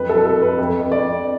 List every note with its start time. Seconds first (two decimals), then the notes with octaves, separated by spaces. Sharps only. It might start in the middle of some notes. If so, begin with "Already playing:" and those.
Already playing: F2 F#3 B4
0.09 A4
0.15 F#3 B4
0.26 A4
0.36 F2
0.42 B4
0.58 F2
0.80 F2
0.92 D5
1.02 F2